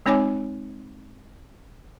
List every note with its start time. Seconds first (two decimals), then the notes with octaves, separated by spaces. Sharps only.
0.06 G#3 C4 D#4 C#5 G#5 D6